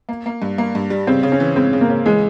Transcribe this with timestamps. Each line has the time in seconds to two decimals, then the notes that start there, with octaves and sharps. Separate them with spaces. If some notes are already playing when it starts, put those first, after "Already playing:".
0.09 A#3
0.26 A#3
0.42 G2
0.58 A#3
0.75 G2
0.90 G3
1.07 C#3 C4
1.23 C#3
1.32 C#4
1.40 E3
1.56 G#3 C4
1.73 C#3
1.81 A#3
1.90 C#3
2.06 E3 G#3